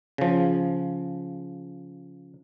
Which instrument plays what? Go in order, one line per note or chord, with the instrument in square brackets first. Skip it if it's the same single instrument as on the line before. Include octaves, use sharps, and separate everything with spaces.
[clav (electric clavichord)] C#3 F3